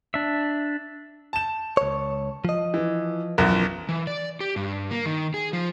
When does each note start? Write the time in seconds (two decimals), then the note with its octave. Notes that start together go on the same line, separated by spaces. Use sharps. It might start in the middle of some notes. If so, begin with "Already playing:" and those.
0.14 D4 E5
1.33 A5 E7
1.77 C#2 C#5
2.45 F3 D#5
2.74 E3
3.38 B1 F#2 E3 F3 A#4
3.89 E3
4.07 D5
4.40 G4
4.56 G2
4.91 A#3
5.06 D#3
5.34 G#4
5.53 F3